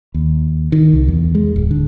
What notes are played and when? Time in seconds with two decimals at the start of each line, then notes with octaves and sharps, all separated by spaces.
0.14 D#2
0.72 D#3
0.93 C2
1.08 E2
1.35 G#3
1.56 D1
1.71 D3